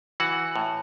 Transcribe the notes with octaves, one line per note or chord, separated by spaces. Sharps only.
E3 F#4 F#5
A2